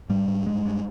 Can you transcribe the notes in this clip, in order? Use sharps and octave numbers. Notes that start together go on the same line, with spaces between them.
G#2 G3
G#2
G2 G#3
G2